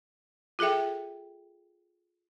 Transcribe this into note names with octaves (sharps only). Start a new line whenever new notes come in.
F4 G#4 A4 E5 G5